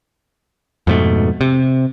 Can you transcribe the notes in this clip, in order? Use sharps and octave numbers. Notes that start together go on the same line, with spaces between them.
F2 G#2 B2 A3
C3